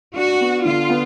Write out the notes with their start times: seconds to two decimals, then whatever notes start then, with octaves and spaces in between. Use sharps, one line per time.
0.15 D4 F#4
0.41 B3
0.65 D3 F4
0.90 B3